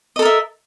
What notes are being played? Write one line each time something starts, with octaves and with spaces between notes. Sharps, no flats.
A4 A#4 D#5 E5